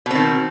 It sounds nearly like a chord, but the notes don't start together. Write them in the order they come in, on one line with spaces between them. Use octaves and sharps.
B2 C4 D#3